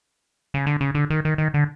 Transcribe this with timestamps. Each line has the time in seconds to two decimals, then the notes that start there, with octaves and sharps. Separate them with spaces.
0.54 C#3
0.66 D3
0.81 C#3
0.95 D3
1.10 D#3
1.25 D#3
1.38 D#3
1.54 D3